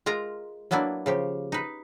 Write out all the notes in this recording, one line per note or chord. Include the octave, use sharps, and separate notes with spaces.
G#3 F4 A#4 A#5
F#3 A#3 B3 D4 E4
C#3 F3 G4
D#4 B4